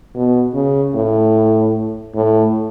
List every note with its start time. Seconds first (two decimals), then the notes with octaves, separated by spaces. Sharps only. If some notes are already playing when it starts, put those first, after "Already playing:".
0.15 B2
0.54 C#3
0.95 A2
2.15 A2